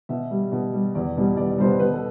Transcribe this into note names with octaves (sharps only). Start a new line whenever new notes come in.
B2 E5
G3
B2
G3
E2 D5
B2 G3
E2 D5
D5
B2 G3 C5
B4
B2 B4
A4